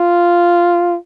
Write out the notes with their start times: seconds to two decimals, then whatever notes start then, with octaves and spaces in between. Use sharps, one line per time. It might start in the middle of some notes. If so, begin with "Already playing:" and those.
Already playing: F4